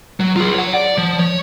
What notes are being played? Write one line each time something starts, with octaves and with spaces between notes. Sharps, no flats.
F#3
F4 G#4
C#5 F#5
D5
F3
C#5